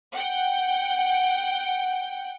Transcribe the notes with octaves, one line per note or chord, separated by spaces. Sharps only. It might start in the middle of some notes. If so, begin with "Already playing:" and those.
F#5 G5